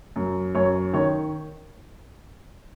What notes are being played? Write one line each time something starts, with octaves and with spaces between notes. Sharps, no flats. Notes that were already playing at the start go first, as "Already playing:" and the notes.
F#2
F#2 C#5
D#3 C#5